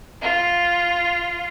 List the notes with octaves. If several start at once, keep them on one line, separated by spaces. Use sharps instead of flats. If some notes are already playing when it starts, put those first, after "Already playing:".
F4